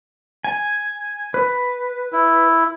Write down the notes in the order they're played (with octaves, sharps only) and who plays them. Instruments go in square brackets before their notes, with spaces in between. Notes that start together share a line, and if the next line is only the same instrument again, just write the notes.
[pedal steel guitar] G#5
B4
[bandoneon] E4